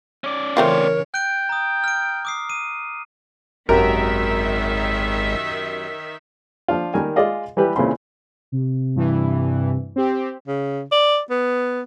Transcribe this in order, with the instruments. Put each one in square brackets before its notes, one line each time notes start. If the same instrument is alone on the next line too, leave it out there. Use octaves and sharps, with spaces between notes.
[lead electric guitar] C#4 D5
[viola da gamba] C#3 E3 C#5 [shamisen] A3 C4 F4 [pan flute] A#4
[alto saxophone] G5 [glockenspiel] F#6 D7
[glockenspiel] A#5 D#6
F6 D7
D6 D#6 C7
D#7
[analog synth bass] G#1 [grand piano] F#2 G4 F#5 [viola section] D#3 E5 [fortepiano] A#4
[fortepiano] F3 D4 F4
D#3 G3 A#4 G#5
G#3 F4 G#4 D5 D#5 F5
E3 G3 G4 B4
A#2 C#3 E3 C4 B5 C6
[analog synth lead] C3
[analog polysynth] G2 E3
C4 G4
[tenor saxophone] C#3
D5
B3